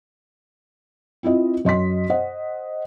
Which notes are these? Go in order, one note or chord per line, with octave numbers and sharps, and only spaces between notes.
C4 E4 F4 D#5
F#2 D#5 C6 B6
C5 D#5 F#5